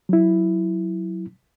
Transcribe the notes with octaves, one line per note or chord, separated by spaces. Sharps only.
F#3 E4